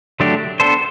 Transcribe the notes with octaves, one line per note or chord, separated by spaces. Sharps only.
D3 F#3 A3 D4 G4
B3 D4 A4 C5